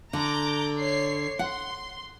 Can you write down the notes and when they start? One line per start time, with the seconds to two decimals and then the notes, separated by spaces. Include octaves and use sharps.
0.13 D3 A#5 D6 G6
0.78 C#5 C7
1.39 F#5 C6